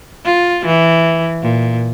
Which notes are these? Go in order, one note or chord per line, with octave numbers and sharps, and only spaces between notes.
F4
E3
A#2